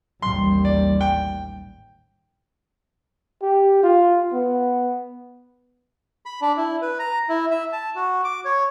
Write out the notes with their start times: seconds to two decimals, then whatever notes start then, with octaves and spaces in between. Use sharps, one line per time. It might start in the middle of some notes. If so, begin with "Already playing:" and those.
0.22 A1 D#2 G3 C6
0.65 D5
1.01 G5
3.42 G4
3.83 F4
4.33 B3
6.26 B5
6.42 D4
6.57 E4
6.82 B4
6.99 A#5
7.29 E4
7.51 E5
7.73 A5
7.96 F#4
8.24 D6
8.45 C#5